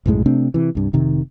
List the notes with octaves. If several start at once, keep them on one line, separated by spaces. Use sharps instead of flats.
B1 F#2 A2 G#3
C3 A3 C4 D4
C3 E3
C2 G2
F1 C3 D#3